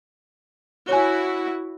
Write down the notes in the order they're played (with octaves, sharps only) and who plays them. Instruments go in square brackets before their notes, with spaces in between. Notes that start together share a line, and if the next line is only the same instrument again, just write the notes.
[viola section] E4 F#4 [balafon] C#5 G#5